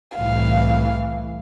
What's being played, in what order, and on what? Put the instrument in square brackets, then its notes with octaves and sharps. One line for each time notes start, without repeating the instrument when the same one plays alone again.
[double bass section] C2 A2 E3 [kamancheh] F5